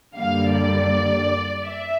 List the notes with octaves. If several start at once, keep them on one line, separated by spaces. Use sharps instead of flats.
F#2 D3 G3 A#3 F5
D5
E5